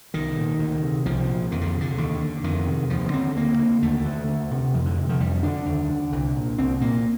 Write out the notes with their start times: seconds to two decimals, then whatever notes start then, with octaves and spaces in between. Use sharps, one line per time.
0.14 C2 D#3
0.37 A#2
0.59 D2
0.82 C3
1.06 C2 F3
1.29 A#2
1.52 F2 D#3
1.61 D3
1.75 C3
1.81 D3
1.98 D#2
2.21 D3
2.44 F2 D#3
2.67 C3
2.90 D#2 F3
3.13 D3 C4
3.36 D2 A#3
3.59 D3
3.82 D#2 A3
4.05 D3
4.29 D2
4.51 C3
4.74 F2 F3
4.86 D3
4.98 C3
5.09 F3
5.20 F2 G3
5.43 D3 D4
5.66 D#2
5.90 D3
6.12 C2
6.36 A#2
6.58 C2 C4
6.81 A#2 A#3